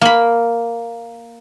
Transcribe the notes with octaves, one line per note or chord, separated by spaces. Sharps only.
A#3 B5